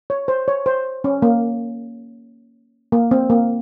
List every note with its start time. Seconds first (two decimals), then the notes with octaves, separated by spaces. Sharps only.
0.10 C#5
0.28 C5
0.48 C#5
0.66 C5
1.04 C#4
1.22 A#3
2.92 A#3
3.11 C4
3.30 A#3